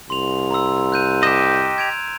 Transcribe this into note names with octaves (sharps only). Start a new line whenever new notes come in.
C2 C6 F7
A#5 C6 E6
F#6 G6 D#7
G4 D#5 G6 E7
G#6 D7 F7